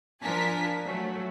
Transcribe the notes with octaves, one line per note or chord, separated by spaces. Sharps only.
F3 D4 A#4 G#5 A5 B6
F#3 A3